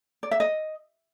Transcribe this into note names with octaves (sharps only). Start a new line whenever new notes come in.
D5
E5
D#5